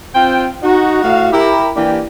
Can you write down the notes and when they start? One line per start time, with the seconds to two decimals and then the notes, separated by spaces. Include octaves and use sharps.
0.14 C4 F4 C5 G5
0.62 D#4 F#4
1.02 A2 F#4 F5
1.32 E4 G4 A#4
1.75 E3 A#3 D4 G4